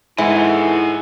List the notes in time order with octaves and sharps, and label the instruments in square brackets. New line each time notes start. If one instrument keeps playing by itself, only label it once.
[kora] G#2 G#3 [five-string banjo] E3 [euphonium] E4 [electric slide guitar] A4 F#5 G#5